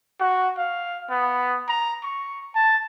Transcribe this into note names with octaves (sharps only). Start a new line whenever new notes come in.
F#4
F5
B3
A#5
C#6
A5